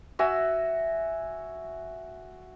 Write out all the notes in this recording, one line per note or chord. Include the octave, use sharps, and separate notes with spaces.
F#4 E5 G#5